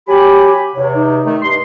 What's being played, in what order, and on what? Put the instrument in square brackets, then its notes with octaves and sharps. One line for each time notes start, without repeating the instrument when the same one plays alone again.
[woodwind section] F#3 G#5 B5 [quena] G4
[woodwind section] E2 C3 [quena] C#5
[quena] D#4
[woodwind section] D#3 A3
G2 C6